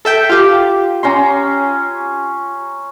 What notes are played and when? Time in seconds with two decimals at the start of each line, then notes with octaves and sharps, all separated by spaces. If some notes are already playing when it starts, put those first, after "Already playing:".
0.05 A4 E5 G5
0.29 F4 G4
1.03 C#4 A#5 C6